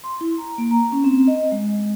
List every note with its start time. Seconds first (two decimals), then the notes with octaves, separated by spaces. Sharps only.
0.04 C6
0.21 E4
0.38 A#5
0.58 A#3
0.71 A#5
0.92 C#4
1.04 C4
1.27 D#5
1.52 G#3